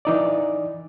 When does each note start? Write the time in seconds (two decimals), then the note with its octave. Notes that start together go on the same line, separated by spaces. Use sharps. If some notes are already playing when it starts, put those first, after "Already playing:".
0.05 E3 D#4 D5